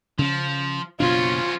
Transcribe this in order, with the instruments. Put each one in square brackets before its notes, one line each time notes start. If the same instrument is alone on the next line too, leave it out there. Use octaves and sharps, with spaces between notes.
[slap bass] C#3 C#4 [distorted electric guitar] F3
[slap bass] F#1 B2 D4 [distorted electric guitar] F3 C#4 [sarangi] F4